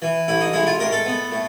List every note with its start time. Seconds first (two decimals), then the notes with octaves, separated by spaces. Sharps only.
0.02 E3
0.28 A1 E4
0.41 D#4
0.53 G#3 E4
0.67 F4
0.79 A2 A#4
0.92 A4
1.06 B3
1.32 A2